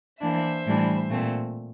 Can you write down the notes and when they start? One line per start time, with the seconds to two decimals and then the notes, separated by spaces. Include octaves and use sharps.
0.21 E3 A#3 D4 C5 E5
0.65 A2 E3 G3 D4
1.09 A#2 A3 C4